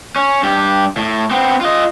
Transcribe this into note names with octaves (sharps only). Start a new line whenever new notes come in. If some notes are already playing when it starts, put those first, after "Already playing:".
C#4
G2 G4
A2
B3 C4
F4 D#5